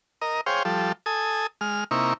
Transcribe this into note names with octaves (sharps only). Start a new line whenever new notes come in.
A#4 D#5
G#4 C5 C#5 F5 G5
F3 G3 A4
A4 G#5 D#6
G#3 F6
C3 A#3 D#4 E4 C#6